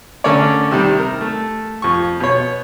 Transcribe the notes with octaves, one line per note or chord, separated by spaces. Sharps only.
D3 A3 C#4 A#4 C#5 D5
C3 D#3 G3
A#4
A3
F2 C#6
B2 C#5